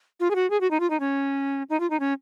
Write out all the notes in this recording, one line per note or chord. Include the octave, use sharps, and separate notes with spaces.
F4
G#4
F#4
G#4
F#4
D#4
F4
D#4
C#4
D#4
F4
D#4
C#4